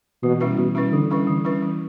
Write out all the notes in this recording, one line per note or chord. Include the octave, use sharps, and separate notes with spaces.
B2 E3
G3 C#4 E4 B4
B2 E3
G3 C#4 E4 B4
D3 E3
G3 C#4 E4 B4
D3 E3
G3 C#4 E4 B4
E3